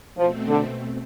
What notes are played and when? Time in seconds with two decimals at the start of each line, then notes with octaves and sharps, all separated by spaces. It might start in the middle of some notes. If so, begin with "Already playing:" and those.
0.17 B2 F3 A3 C4
0.48 D3